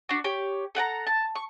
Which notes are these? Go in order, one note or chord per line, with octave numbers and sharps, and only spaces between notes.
D4 F#4
G4 C#5
A4 F#5 G5 A#5
A5
C#6